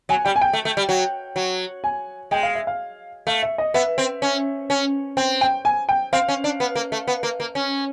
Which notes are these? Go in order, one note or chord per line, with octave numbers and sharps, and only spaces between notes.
F#3 G#5
G3 G5
G#5
G5
A3
A3
G3
F#3
F#3
G#5
G#3 G5
F5
E5
F5
A3 F5
E5
D#5
B3 E5
C4
C#4
C#4
C4 G5
G5
G#5
G5
C4 F5
C#4
D4
B3
A#3
A3
B3
A#3
A#3
C#4